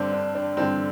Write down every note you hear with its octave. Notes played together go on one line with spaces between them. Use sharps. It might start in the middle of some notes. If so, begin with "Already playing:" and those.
Already playing: G2 D3 C4 D4
D4
D4
G2 D3 C4